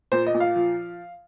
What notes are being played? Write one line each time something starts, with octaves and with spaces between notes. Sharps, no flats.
A#2 C5
D#5
A#2
F5
F3